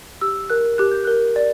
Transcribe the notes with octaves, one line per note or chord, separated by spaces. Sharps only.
G4 E6
A#4 F#6
G4 F#6
G6
A#4 F#6
D5